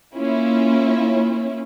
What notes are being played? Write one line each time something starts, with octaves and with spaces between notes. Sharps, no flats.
A#3 C#4 E4 F4